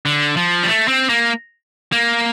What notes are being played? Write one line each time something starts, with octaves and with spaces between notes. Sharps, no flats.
D3
F3
G3
A3
C4
A#3
A#3